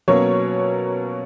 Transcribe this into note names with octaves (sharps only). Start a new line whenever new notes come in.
B2 F#3 A#3 C#4 C#5